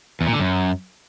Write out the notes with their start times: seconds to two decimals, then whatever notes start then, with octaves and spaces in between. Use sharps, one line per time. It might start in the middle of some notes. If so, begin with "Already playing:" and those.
0.21 E2
0.27 A#2
0.33 D3
0.39 F#2